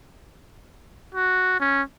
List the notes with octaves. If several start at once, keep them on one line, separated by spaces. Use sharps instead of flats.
F#4
C#4